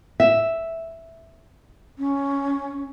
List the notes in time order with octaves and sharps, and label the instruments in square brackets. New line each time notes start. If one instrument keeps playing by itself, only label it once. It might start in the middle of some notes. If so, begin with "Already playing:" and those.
[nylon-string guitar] E5
[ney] C#4